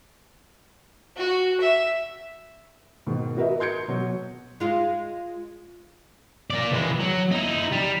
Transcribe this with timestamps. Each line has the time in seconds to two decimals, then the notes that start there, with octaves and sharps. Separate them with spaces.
1.17 F#4
1.60 E5
3.07 G#2 B2 D#3
3.37 F#4 A#4 B4 D#5 E5
3.60 C6 G6 G#6 C#7
3.88 B2 F#3
4.60 G#3 F4
6.50 A#4 D5
6.72 E3 G#3
7.00 F#3
7.32 D#4 E4
7.72 G3